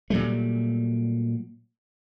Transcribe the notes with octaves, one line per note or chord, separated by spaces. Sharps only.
A#2 F#3 G3 A3